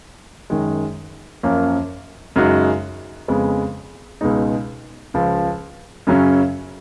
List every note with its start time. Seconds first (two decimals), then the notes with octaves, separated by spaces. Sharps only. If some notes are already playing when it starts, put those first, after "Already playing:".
0.50 F#2 D#3 G#3
1.43 F#2 F3 A#3 C#4
2.36 F#2 C#3 G#3 D#4 F#4
3.28 F2 C#3 G#3 B3
4.21 C#2 B2 G#3 D#4
5.14 C#2 C#3 F3
6.07 F#2 C#3 F#3 C#4